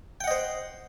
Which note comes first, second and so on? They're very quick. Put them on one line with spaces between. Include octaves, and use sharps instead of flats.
G5 F#5 D#5 C5